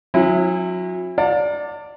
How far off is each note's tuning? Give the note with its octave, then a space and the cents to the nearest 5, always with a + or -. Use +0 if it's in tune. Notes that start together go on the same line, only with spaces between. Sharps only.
F#3 -35 C#4 -40 E4 +0
D5 +0 F5 +40 A5 +45